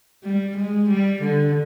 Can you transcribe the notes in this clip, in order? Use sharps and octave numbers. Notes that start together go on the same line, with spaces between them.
G3
G#3
G3
D3